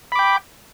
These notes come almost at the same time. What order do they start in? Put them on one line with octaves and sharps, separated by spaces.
B5 D6 G5